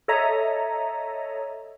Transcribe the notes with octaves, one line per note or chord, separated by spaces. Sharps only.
A4 C#5 D#5 E5 A#5